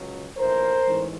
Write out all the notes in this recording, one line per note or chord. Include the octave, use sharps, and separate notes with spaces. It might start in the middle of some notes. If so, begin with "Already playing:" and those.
Already playing: C#2 C#3 F#3
A#1 A2 E3 A#4 C5
A1 G#2 E3 G#3 C#4